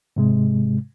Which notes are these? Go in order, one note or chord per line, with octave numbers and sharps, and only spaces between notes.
G#2 C3 G#3